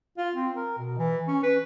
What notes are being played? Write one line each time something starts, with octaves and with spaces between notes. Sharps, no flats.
F4
C4
A#4
B2
E3
C#4
B4